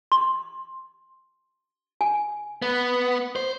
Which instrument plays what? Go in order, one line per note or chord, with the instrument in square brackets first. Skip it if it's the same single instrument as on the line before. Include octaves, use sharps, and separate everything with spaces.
[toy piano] C6
G#5
[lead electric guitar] B3
C5